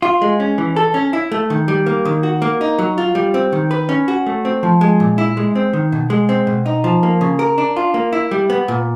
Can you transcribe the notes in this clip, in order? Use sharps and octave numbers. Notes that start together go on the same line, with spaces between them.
F4
G#3
C#4
E3
A4
C#4
E4
A3
D#3
G3
A#3
D#3
F#4
A#3
D#4
F#3
F4
G3
C4
D#3
B4
C#4
F#4
A3
C4
F3
G#3
A#2
E4
G#3
C4
D#3
B2
G#3
C4
B2
D#4
F3
A#3
C#3
A#4
D4
F4
A#3
E4
G3
B3
A#2